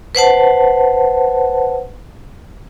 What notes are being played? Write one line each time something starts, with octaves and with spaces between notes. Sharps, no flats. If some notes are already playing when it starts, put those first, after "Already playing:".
B4 C5 F#5 A5